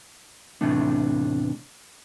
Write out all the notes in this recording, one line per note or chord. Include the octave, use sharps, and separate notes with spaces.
E2 A2 C3 A3 D4